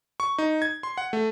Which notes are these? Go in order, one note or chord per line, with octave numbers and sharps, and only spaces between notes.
C#6
D#4
G#6
C6
F#5
A3